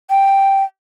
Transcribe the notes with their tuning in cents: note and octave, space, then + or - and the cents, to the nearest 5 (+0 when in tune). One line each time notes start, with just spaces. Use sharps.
G5 +0